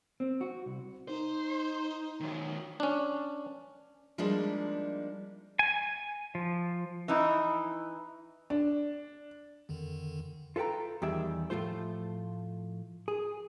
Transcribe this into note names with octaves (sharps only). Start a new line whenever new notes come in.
C4
F#4
C2
D#4 C5
D#3 F#3
C#4 D4
F3 G3 G#3 A#3 D4 D#4
G#5
F3
E3 D#4 E4
D4
F2 D3 D#3
F4 A4 B4 G5 A#5
E2 D#3 G3 G4 G#4 E5
A2 F3 A3 F4 C5
G#4